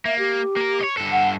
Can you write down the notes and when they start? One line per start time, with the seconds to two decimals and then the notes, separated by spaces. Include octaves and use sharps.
0.05 A#3 E5
0.19 G4
0.56 A#3 A#4
0.80 C#5 D#5
0.97 G2 A4
1.12 F#5